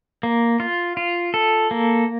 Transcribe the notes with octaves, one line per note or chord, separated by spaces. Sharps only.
A#3
F4
F4
A4
A#3